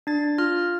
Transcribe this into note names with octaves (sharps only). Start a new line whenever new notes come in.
D4 A6
F4 F6